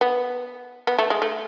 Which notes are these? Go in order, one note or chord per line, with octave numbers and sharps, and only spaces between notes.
B3
B3
A3
G#3
A3